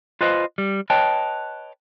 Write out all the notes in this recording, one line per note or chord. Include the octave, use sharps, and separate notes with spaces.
F4 B4 C5 D#5
G3
B4 C#5 D#5 G5 A5